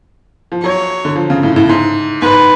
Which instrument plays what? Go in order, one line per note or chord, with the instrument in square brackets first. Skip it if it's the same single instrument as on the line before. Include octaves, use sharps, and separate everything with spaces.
[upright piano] F3
[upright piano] F#3 [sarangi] C#5
[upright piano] D3
F3
C#3
A2
A2
G#2
[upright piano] G#2 [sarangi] B4